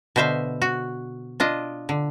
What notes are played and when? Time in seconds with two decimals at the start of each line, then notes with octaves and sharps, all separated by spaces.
0.16 B2 D3 C5 E5 F5
0.62 F#4
1.40 D4 F4 D#5
1.89 D3